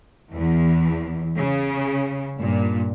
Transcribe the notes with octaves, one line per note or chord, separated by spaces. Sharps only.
E2
C#3
G2 A#2